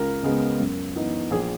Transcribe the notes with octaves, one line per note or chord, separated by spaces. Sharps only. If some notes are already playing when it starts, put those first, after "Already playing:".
Already playing: C#2 A#4
C#3 G#3 B3
F#2
E3 B3 D#4
A#1 G#4